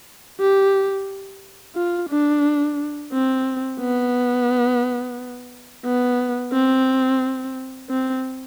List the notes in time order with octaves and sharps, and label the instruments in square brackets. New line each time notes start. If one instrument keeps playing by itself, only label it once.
[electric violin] G4
F4
D4
C4
B3
B3
C4
C4